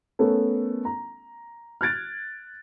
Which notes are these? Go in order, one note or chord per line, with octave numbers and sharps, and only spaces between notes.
A3 B3 C#4 A4 A#4
A#5
F6 F#6 G#6 A6 D7